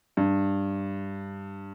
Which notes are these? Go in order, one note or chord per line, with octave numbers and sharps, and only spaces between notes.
G2